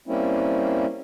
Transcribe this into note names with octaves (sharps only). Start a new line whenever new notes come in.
G3 A#3 C4 C#4 E4